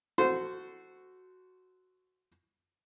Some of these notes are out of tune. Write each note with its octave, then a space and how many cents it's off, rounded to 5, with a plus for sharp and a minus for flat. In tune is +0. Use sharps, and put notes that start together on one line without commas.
F#4 +0 A4 +0 C5 -15